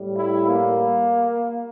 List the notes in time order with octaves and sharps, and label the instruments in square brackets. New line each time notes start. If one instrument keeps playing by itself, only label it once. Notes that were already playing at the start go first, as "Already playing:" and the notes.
Already playing: [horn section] A2 G3
E4
A#3